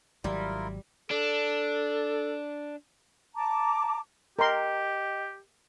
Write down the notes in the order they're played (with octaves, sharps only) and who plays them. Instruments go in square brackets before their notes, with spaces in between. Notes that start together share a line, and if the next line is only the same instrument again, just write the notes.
[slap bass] G#1 F#3 [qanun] G3 [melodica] E4 F4 A#4
[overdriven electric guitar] D4 [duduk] A4
[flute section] A5 A#5 D6
[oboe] G4 [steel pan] A#4 C6 [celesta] D#5 G5